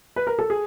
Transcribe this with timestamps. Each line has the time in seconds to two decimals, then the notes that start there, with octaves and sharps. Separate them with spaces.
0.16 B4
0.27 A#4
0.39 A4
0.50 G#4